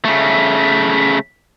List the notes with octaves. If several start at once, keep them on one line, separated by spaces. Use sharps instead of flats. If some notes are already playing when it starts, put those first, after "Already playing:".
C#3 A3